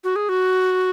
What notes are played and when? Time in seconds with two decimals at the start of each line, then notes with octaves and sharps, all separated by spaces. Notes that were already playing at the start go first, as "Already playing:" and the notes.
0.04 F#4
0.16 G#4
0.29 F#4